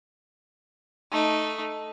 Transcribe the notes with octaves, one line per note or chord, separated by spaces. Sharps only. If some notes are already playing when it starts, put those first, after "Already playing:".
A3 D#4